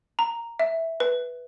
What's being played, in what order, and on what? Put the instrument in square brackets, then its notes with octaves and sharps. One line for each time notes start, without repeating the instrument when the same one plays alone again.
[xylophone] A#5
E5
B4